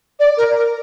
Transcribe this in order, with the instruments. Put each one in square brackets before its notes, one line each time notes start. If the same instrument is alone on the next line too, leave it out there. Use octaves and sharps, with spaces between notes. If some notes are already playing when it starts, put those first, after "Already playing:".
[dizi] D5
A#4
A#4